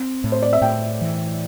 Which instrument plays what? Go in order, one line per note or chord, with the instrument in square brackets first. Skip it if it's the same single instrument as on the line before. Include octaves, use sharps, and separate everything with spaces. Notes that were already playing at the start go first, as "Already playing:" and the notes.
Already playing: [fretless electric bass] C4
A2
[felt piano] C5
D5
E5
[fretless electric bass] A2 [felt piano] G5
[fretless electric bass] E3